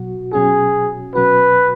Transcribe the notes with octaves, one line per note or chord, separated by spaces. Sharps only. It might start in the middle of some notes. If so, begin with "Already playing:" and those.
Already playing: B2 F#3 F#4
B2 F#3 C#4 F#4 G#4
B2 F#3 C#4 F#4 B4